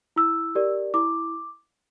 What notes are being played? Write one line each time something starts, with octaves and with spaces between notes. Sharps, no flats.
E4 E6
G4 A#4 D5
E4 D6